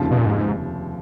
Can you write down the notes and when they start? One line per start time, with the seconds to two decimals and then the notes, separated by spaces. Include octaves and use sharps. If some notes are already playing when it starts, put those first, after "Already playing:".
Already playing: F1 D#2 C#3 F3
0.11 B2
0.18 A#2
0.25 G#2